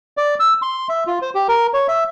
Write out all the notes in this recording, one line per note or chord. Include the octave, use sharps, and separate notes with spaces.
D5
E6
C6
E5
F4
C5
G4
A#4
C#5
E5